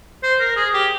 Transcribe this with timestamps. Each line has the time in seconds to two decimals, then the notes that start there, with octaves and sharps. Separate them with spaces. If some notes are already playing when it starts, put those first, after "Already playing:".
0.23 C5
0.40 A#4
0.56 G#4
0.74 G4